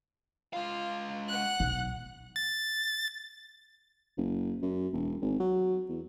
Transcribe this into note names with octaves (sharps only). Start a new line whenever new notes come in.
G#3 F4 F5
F#5 F#6
B1
A6
F#1
F#2
E1
G#1
F#3
E2